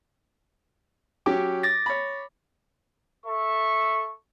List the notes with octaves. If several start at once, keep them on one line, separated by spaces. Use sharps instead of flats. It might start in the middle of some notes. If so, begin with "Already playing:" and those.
F#3 C#4 G4 D6
D6 A6 A#6
C#5 B5
A4 E5 C#6